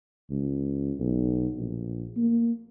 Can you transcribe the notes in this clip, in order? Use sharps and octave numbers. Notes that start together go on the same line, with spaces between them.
C#2
B1
A#1
A#3